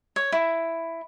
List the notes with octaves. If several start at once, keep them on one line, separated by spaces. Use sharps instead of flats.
C#5
E4